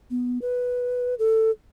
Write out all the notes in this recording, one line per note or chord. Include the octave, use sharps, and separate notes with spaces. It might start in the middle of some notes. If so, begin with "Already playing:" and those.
B3
B4
A4